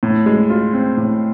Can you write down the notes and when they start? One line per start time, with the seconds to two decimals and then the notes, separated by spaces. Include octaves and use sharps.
0.03 A2
0.26 G#3
0.50 F4
0.73 C4
0.97 A2